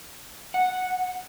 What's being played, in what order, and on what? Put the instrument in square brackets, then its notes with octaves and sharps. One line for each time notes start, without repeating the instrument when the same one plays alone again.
[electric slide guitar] F#5